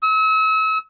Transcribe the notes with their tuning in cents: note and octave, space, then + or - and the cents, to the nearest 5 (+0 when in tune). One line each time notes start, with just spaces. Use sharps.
E6 -40